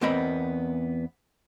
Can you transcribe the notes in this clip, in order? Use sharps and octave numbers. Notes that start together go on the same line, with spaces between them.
E2 B3 C4 A#4 D#5 B5